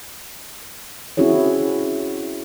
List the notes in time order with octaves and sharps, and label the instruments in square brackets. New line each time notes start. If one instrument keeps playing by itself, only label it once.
[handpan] C4 C#4 E4 F#4 G#4 C#5